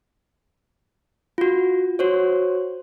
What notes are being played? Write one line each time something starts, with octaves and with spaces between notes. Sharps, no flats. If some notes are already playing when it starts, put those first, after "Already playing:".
F4 F#4
F#4 C5 C#5